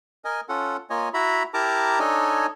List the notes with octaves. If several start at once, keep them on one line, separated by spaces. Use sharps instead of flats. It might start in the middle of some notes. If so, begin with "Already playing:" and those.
A#4 D#5 G#5
C#4 F4 A4 F#5
A#3 F4 C#5 D#5 G#5
E4 F#4 E5 A#5 B5
E4 G4 A#4 A5 A#5 D6
D4 D#4 A4 C#5 D#5 G#5